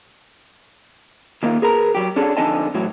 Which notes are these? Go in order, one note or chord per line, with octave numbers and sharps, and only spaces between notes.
D#3 A#3 D#4 F4
G#4 A#4 B4 A#5
F#3 G4
C#4 D4 G#4 A4
F2 D3 D#4 D#5 G#5 A5
A2 E3 F#3